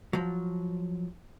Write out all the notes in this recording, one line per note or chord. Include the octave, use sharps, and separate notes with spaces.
F3 F#3